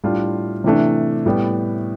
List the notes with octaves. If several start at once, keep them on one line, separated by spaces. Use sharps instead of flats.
A2 G3 D4 F4
C3 E3 A3 D4
A2 G3 B3